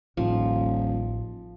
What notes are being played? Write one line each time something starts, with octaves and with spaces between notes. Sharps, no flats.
D#1 A1 F3